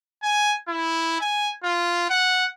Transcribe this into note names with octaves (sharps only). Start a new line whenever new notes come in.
G#5
E4
G#5
F4
F#5